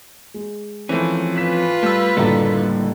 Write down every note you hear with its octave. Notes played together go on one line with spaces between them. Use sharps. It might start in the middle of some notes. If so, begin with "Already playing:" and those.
G#3
E3 F3 A3 C4 C#4
F4 B4 B6 E7
G3 A3 E6
F#1 A2 D3 G3 A4 A#5